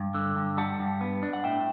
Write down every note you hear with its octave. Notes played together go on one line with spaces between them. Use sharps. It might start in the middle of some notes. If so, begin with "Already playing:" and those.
Already playing: G2
D3
G2
G3 F#5 A5
G2
B3
D4
F#5
A2 E5 G5